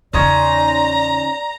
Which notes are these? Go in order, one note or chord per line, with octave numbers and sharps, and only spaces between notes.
E2 C#3 C#4 D#4 C5 D5 A#5